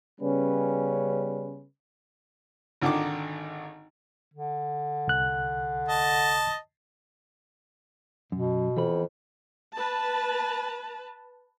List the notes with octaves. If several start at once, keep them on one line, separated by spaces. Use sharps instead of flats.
C#3 G3 B3 C#4 B4
G#1 D3 D#3 D6
D3
C2 F#6
D#5 A5
F#2 B2
F2 E3 B3 B5
B4 A5